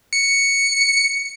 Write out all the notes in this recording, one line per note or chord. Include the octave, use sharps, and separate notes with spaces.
C#7